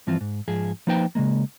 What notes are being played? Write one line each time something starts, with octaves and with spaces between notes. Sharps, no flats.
G2 E3 F3 C4 F4
G#2
G#2 F3 G#4
F3 A#3 D#4 B4 C5 G5
C#3 F3 G#3 A#3